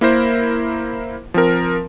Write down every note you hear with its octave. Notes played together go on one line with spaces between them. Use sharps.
A#3 E4 A#4 C5
F3 C4 A#4